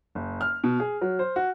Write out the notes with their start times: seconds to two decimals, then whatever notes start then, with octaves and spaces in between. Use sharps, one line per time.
0.15 F#1
0.41 F6
0.64 B2
0.80 G#4
1.01 F#3
1.19 C5
1.36 F#4